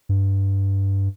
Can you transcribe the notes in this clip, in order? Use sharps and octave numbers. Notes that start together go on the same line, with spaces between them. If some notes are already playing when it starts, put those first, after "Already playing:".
G2